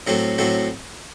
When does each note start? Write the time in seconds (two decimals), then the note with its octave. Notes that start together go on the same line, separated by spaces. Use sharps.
0.07 A2 F#3 C4 F#4 A4
0.38 A2 F#3 C4 F#4 A4